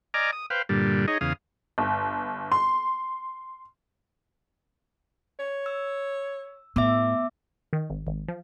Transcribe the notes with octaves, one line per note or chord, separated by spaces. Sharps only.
D5 D#5 G#5 A#5 D6 F6
D#6
B4 C5 F5 G5
G2 A#2 D3 G3
D#4 G#4 C#5 D#5
E2 C#3 F5 D#6
G1
C6
C#5
E6
A2 B3 E5 D6 E6
D#3
G#1
G#1
F3